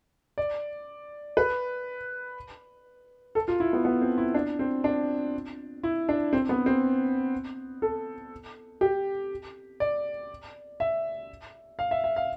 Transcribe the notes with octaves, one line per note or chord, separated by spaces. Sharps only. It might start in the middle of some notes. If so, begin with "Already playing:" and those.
D5
B4
A4
F4
E4
B3
B3
C4
E4
D4
C4
D4
E4
D4
C4
B3
C4
A4
G4
D5
E5
F5
E5
E5
F5